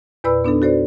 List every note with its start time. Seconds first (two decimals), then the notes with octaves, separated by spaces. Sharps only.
0.24 E2 A#2 B4 D5 B5 E6
0.44 B3 D4 D#4 A4
0.62 F#4 A4 C5 D5